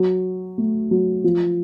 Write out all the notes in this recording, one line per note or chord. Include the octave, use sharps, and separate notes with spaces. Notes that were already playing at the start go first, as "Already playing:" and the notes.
Already playing: F#3
A3
F#3
F3